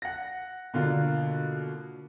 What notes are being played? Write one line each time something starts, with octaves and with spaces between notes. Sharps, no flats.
F#5 A#6
B2 D3 A#3 F4